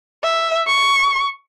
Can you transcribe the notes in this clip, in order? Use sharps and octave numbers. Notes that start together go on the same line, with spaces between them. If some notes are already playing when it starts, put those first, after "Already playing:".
E5
C#6